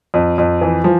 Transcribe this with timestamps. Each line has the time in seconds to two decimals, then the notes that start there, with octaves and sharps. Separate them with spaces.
0.14 F2
0.38 F2
0.61 E3
0.84 F3